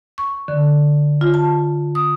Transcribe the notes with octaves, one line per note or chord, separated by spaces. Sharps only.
C#6
D3
F4
A5
D#6